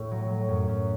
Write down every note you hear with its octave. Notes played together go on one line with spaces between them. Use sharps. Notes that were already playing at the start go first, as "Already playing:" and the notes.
Already playing: A2
F#3
F#3
F#2
F#2